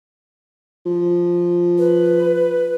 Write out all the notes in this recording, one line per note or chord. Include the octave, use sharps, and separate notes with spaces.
F3
B4